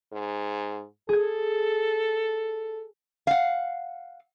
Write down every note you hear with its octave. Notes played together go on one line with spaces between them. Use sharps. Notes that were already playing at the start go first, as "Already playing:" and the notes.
G#2
G#4 A4 G#6
F5 F#5